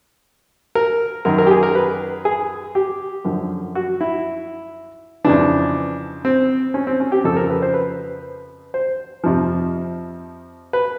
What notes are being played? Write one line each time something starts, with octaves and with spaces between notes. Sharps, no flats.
A#4
F#2 D#3 A#4
A#4
G4
G#4
A#4
B4
G#4
G4
F#2 D3 F3
F#4
E4
F2 C#3 E3 D4
C4
C#4
C4
C#4
G4
F2 C#3 F3 A4
A#4
B4
C5
B4
C5
F2 C3 F3
B4